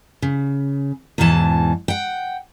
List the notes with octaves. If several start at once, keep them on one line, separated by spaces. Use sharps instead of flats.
C#3
E2 G#2 B2 E3 A5
F#5 G5